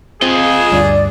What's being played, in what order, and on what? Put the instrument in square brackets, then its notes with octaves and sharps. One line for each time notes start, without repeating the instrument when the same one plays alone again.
[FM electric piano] C4 [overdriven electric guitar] F4 D#5 [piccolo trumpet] G#4
[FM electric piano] D2 G2 [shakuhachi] D5